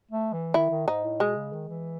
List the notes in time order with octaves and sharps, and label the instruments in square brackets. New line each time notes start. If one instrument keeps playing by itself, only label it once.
[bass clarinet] A3
E3
[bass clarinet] D#3 [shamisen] E4
[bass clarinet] D#3
[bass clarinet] G#2 [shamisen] D#4
[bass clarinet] A2
[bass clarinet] B2 [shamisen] G#3
[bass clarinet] C#3
D#3
E3